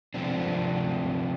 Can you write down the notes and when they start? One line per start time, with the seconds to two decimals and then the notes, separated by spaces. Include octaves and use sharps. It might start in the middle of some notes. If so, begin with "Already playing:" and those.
0.14 C3 F3 C4 D4